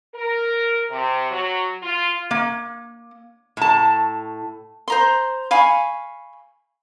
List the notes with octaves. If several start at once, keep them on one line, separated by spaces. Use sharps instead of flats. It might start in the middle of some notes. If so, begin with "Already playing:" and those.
A#4
C3
F#3
F4
A#3
A2 A5
C5 A#5 C6
F5 G#5 B5 C#6